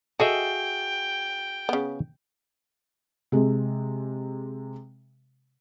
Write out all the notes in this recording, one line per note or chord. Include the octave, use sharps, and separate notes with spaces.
F#4 G#4 A4 D#5 E5 G5
C#3 B3
C3 G#3